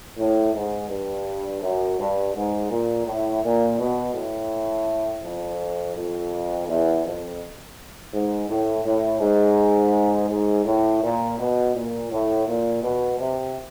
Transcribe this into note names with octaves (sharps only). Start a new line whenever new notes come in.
A2
G#2
G2
F#2
G2
G#2
A#2
A2
A#2
B2
A2
F2
F2
E2
F2
G#2
A2
A2
G#2
G#2
A2
A#2
B2
A#2
A2
A#2
B2
C3